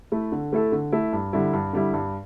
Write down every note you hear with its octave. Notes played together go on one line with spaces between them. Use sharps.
A3 E4 A4
D3
A3 E4 A4
D3
A3 E4 A4
G2
D3 G3 E4
G2
D3 G3 E4
G2